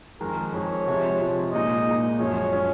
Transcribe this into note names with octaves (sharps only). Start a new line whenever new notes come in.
F2 D#3 G#3 A#4
F2 D#3 G#3 C#5
C3 F3 G#3
C3 F3 G#3
A#2 G#3 D#4 D#5
A#2 G#3 D#4
F#2 F3 G#3 C#4 C#5
F3 G#3 C#4